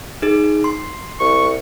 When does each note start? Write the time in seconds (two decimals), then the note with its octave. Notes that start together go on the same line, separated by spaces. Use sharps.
0.22 D#4 G#4
0.64 C6
1.20 C2 C#6